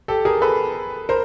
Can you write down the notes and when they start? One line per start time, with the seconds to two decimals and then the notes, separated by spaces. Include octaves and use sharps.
0.08 G4 A4
0.25 G#4 A#4
0.42 A4 B4
1.09 A#4 C5